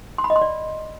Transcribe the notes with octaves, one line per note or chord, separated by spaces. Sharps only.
C6
B5
D#5
C6
D5